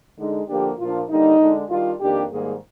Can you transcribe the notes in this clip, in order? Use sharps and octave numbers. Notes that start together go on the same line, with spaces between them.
D3 G#3 D#4
D3 F3 A#3 D4 G4
A#2 F3 A#3 D4 F4
D3 G3 A#3 D#4
D3 G#3 D4
D#3 G3 D4 F4
F2 D#3 A#3 D4 G4
G#2 D#3 G3 A#3 G#4